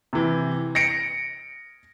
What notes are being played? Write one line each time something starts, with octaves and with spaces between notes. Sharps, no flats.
C3 E3
A#6 C#7 D7